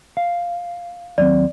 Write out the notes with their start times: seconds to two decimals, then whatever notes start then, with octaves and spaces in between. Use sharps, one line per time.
0.17 F5
1.18 D#2 F#3 C4 D5